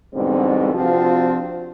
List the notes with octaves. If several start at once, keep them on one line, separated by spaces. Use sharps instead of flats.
E2 G#2 B2 D3 G3 C4
C3 F3 C4 D4 F4 F#4